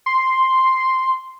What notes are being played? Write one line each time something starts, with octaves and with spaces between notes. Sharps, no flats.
C6